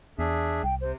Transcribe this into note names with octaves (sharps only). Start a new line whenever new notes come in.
E2 D4 G#4 E5
C2 G5
C3 C5